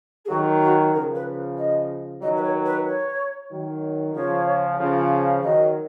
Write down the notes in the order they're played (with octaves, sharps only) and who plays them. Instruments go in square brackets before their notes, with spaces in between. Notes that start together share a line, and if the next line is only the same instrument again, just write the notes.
[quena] G#4
[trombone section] D#3 F#3 [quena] F#4
[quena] F#4
[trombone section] C#3 F3 [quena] A#4
[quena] B4
D#5
[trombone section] D#3 F#3 [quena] D#5
[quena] B4
C#5
B4
C#5
[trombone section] D#3 F#3
[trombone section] C#3 F3 [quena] C#5
[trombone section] C#3 F3
[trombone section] D#3 F#3 [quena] D#5